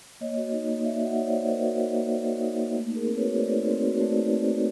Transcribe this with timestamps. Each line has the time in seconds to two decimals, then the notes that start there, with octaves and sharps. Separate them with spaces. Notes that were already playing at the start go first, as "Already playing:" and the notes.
0.21 A#3 C#5 D#5
0.37 F#4
0.52 D#4
0.68 A#3
0.84 A#3 D5 E5
1.01 F#4 E5 F#5
1.15 D#4 C#5
1.27 A#3 C5 D5
1.48 A#3 A#4 C5
1.63 F#4
1.80 D#4
1.95 A#3
2.11 A#3
2.26 F#4
2.42 D#4
2.58 A#3
2.74 A3
2.90 D#4
2.96 G#4 A#4
3.06 C4
3.17 B4 C#5
3.22 F#4
3.28 C#5
3.38 A3 C5 D5
3.53 D#4
3.70 C4
3.85 F#4
4.00 A3 C5 D5
4.17 D#4
4.32 C4
4.48 F#4